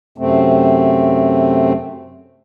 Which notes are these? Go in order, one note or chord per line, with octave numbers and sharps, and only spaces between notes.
F#2 C3 A3 C4